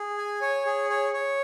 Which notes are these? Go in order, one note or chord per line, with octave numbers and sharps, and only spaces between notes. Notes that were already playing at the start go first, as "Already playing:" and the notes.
Already playing: G#4
G#5
C#5
G#4
C#5
C#5